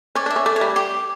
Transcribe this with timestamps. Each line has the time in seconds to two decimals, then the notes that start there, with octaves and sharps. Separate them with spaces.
0.15 C#4 D5
0.26 D4 E5
0.36 C#4
0.46 A3 D5
0.56 C#5
0.61 G3
0.76 G4